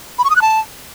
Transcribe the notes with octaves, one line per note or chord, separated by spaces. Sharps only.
B5
C#6
D#6
F#6
A5